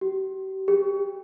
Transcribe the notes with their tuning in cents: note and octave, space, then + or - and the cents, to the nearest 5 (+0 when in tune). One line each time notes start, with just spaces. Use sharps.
G4 -40
G4 +20